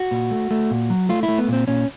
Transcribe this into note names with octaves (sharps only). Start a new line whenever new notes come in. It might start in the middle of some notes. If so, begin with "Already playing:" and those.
Already playing: F#4
A#2
A3
A3
A#2
F#3
A3 F4
E4
A3
B3
A#2 C4
A#2 C#4